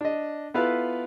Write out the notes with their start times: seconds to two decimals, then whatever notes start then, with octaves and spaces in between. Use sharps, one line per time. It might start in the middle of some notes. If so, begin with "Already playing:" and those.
0.01 D4 D#5
0.54 B3 E4 F4 A4 B4 F5